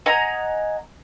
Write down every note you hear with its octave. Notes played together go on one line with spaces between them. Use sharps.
D#5 F#5 G#5 A#5